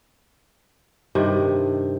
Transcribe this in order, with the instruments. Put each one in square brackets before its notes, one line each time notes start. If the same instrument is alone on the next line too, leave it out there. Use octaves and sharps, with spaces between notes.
[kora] G2 C3 D#3